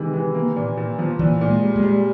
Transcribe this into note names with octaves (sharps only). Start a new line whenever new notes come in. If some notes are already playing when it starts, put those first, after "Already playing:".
Already playing: C3 D#3 E3 G#3
E3
A#3
A#2
A#2
F3
A#2 E3
A#2
G#3
G3
G#3
G3